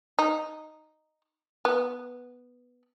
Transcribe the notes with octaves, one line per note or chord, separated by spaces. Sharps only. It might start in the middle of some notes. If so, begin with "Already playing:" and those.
D#4
B3